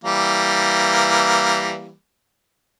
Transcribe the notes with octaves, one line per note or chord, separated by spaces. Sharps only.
E3 G3 A#3